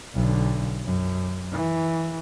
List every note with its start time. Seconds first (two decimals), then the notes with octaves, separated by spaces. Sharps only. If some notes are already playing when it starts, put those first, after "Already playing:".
0.14 B1 D3
0.84 F#2
1.52 E3